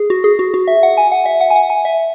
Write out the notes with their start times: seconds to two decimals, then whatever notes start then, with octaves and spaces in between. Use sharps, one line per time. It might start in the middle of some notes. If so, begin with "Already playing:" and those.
Already playing: G#4
0.10 F#4
0.24 G#4
0.39 F#4
0.54 F#4
0.68 E5
0.83 F#5
0.97 G#5
1.12 F#5
1.26 E5
1.41 F#5
1.50 G#5
1.56 F#5
1.70 G#5
1.85 E5